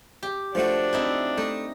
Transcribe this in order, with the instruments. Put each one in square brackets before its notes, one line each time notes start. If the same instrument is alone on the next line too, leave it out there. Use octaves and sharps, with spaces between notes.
[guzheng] G4
[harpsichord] F3 A3 F#4 [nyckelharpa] D4
[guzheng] C4 D#4 E4
[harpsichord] A3 [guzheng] D#4